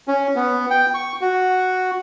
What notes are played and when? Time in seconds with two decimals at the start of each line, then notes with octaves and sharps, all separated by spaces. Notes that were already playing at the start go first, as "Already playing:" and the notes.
0.08 C#4
0.36 B3
0.70 G5
0.94 C#6
1.21 F#4